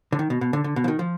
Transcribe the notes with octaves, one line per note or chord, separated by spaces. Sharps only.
D3
D#3
B2
B2
D3
D3
B2
F3
D#3
F3